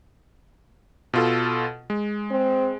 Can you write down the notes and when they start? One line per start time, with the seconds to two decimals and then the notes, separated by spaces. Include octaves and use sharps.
1.13 B2 F4 A4
1.90 G#3
2.31 C4